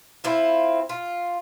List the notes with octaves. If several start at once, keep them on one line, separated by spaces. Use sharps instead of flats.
C4 E4 F4
F4